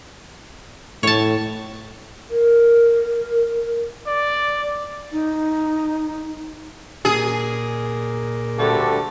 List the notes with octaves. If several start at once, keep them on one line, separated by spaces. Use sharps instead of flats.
A2 C#5 A5
A#4
D5
D#4
A#2 G#4
D2 D3 G3 A3